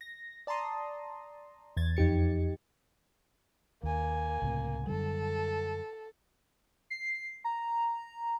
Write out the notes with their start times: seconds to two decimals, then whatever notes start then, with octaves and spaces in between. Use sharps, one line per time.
0.01 A#6
0.47 D5 A5 A#5 C6 D#6
1.77 E2 G#6 A6
1.97 F2 D#4 G4 C#7
3.83 D#2 A#3 G#5
4.42 C#2 A2 C3
4.87 F#2 D3 G3 A4
6.90 C7
7.44 A#5